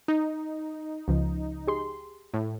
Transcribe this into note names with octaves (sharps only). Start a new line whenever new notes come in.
D#4
C#2 F3
G4 G#4 C6
A2